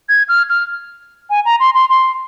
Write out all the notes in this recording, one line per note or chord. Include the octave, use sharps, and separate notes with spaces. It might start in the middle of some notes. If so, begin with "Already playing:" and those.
G#6
F6
F6
G#5
A#5
C6
C6
C6